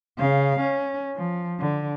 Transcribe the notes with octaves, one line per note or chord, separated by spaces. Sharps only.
C#3 F5
C#4
F3
D3